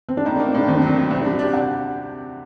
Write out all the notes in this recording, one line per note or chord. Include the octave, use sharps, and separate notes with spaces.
C4
D4
A2 D#4
A#3 D4
C4
A2 D4
D#2 C4
D4
F#3
D#2
C2 C4
G3 D4
F#4
D4 G4
C3 F#5